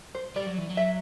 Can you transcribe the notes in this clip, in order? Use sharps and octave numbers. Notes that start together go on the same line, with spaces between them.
C5
G3 D5
F#3
E3
F#3
E5